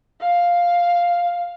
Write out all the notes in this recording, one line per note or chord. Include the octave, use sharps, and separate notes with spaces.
F5